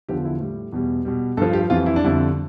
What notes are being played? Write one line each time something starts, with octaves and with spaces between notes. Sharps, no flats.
E2 D3 F3 G4
E4
A2 G3
E2 B2 G3
B2 G3
G2 F3 A4
G4
F2 E3 G3 F4
E4
D4
F2 D3 G3 E4